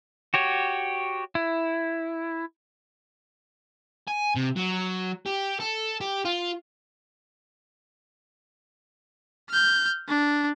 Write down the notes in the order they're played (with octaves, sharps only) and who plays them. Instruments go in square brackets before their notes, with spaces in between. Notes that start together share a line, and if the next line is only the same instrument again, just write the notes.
[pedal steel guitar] F#4 G4 C#5
E4
[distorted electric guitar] G#5
C3
F#3
G4
A4
G4
F4
[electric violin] F6 G6
D4